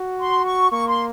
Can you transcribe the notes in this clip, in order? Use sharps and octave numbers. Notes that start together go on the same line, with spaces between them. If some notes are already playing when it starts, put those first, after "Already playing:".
Already playing: F#4
C6
C#6
A#3 C#6
C6